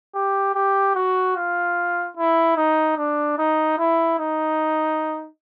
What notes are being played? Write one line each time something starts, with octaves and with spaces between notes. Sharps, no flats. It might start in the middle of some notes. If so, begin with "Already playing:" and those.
G4
G4
F#4
F4
E4
D#4
D4
D#4
E4
D#4